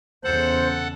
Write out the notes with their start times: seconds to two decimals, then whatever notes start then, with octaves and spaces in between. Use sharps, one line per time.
0.24 E2 C#3 A4 C5 F#5